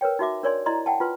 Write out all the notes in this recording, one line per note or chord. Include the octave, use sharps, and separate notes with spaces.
A#4 B4 C#5 G5
D#4 F#4 E5 D6
D4 A#4 C#5 D5 G#5 C6
E4 D5 D#5 A#5 C6
F#5 G5 A5
F4 B4 C6